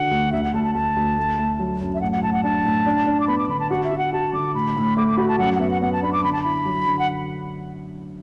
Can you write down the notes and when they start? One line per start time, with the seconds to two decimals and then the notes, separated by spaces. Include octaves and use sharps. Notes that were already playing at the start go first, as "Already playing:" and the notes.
Already playing: D3 F#4 F#5
0.11 D2
0.32 D2 E5
0.44 F#5
0.54 D2 A5
0.64 A5
0.75 D2 A5
0.96 D2
1.17 A3
1.39 A3
1.59 F#3
1.80 F#2
1.95 E5
2.01 A2 F#5
2.12 F#5
2.22 A2 A5
2.33 F#5
2.43 D4 A5
2.65 A2
2.86 D4
3.06 D4
3.20 D6
3.28 B3 B5
3.38 D6
3.49 D3 B5
3.60 A5
3.70 F#4 F#5
3.84 E5
3.91 F#4
3.98 F#5
4.13 F#4 A5
4.33 D3 D6
4.54 A2 B5
4.76 A2
4.97 A3 D6
5.08 D6
5.17 F#4 B5
5.28 A5
5.39 F#2 F#5
5.56 F#5
5.60 B3 E5
5.70 F#5
5.82 B3 F#5
5.93 A5
6.02 D4 B5
6.13 D6
6.24 D3 B5
6.33 A5
6.43 E4 B5
6.65 F#3
6.87 D3
6.99 F#5